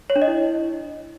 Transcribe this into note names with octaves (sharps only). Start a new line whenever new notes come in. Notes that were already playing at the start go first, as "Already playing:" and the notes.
C#5
D4
D#5
E4